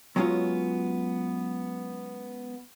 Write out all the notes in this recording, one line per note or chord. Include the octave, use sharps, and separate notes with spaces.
F#3 G#3 B3 C#4 F4